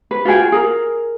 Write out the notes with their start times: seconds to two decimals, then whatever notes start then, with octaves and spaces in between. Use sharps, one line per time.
0.11 B4
0.25 F4 F#4 G#4 G5
0.52 G#4 A#4